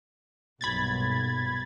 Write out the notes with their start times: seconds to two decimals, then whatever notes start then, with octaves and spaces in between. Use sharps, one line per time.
0.61 B1 G2 A#2 B5 G#6 A6